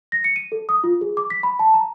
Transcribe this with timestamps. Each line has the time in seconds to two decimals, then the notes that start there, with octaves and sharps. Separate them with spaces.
0.12 A#6
0.24 C#7
0.36 D#7
0.52 A4
0.69 D#6
0.84 F4
1.01 G#4
1.17 D6
1.30 B6
1.43 B5
1.59 A5
1.74 A#5